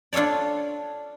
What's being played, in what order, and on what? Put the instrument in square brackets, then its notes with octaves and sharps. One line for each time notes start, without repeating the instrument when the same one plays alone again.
[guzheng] D4 F4 A4 C#5 D5